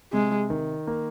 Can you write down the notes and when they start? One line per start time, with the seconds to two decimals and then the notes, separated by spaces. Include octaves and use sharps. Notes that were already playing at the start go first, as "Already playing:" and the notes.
0.13 C3 G#3
0.50 D#3
0.87 A#3